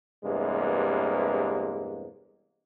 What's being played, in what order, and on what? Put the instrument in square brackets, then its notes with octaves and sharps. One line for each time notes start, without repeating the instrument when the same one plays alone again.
[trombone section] E2 G2 C3 G#3 A#3